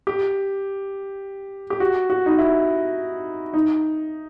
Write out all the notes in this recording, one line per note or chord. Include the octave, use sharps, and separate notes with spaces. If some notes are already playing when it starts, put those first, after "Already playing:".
G4
G4
F#4
F#4
D#4
E4
D#4